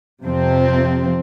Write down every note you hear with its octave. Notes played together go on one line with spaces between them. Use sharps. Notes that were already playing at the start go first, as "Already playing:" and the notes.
F2 C3 F3 C4